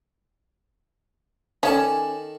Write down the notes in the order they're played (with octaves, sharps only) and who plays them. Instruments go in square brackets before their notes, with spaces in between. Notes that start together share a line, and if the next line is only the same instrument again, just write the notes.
[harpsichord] D#3 A4 D5 [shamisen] C#4